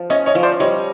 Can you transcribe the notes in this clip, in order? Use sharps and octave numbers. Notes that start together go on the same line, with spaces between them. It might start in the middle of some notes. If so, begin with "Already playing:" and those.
Already playing: F3
C#4 C#5 D#5
C#5 D#5
F3
C5 D5
G3 C#5 D#5